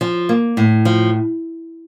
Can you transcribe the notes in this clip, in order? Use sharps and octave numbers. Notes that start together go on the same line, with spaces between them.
F3
A#3
A2
F3